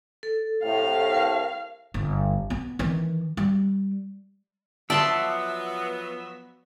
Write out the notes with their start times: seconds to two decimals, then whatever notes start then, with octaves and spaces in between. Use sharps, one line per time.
0.23 A4
0.63 A2 C3 F5
1.14 A#4
1.94 G1
2.50 B3
2.79 D#3 E3
3.37 G3
4.90 F3 F#3 B3 D5 E5 A5 C6 C#6